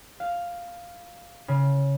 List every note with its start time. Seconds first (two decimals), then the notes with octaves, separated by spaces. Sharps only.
0.20 F5
1.48 C#3